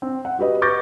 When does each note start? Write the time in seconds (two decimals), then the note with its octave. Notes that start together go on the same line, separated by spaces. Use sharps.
0.02 C4
0.25 F#5
0.39 F#4 G4 B4 D#5
0.62 B4 C#6 D6 G6 A6 A#6